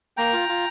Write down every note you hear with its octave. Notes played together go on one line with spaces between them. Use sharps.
A#3 G5 A#5
F4
F4